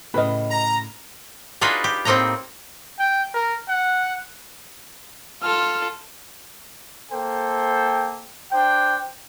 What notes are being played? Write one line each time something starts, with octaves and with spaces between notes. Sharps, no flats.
A2 C#3 B4 D#5 F6
A#5
D4 D#4 F4 F#4 G#4 B4
G4
A2 A#3 C4 D#4 G5 A#5
G5
A#4
F#5
F4 A4 F6
A#3 A4 C5 G5
D4 C5 G5